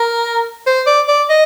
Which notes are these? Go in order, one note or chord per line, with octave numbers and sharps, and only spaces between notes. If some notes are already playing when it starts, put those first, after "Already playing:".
Already playing: A#4
C5
D5
D5
D#5